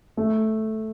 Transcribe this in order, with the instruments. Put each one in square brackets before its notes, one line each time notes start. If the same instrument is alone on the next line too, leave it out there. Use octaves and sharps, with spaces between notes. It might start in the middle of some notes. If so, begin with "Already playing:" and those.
[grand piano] A3